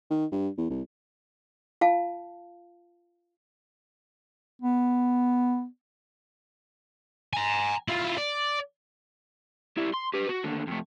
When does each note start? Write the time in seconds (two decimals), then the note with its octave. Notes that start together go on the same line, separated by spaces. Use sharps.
0.10 D#3
0.32 G2
0.57 E2
0.70 C2
1.81 F4 F5 A5
4.62 B3
7.33 G#5 A#5
7.88 E4 F4
8.18 D5
9.77 G3 E4
9.94 C6
10.14 G4 B4
10.29 F#4
10.44 D#2 D3
10.68 F2 A3